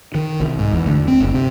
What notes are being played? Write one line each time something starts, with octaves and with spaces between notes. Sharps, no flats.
D#3
C2
G#2
E2
D2
C4
F#1
C3